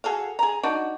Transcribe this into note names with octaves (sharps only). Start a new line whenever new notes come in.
F#4 G#4 A4 F5
G#4 A#5
D4 D#4 F#4